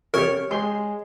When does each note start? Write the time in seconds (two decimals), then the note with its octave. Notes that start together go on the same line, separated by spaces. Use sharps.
0.14 F2 C3 G3 A#4 C#5
0.51 G#3 G4 C#5 C6